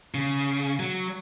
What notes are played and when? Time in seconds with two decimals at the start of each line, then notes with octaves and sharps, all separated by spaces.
0.14 C#3
0.80 F#3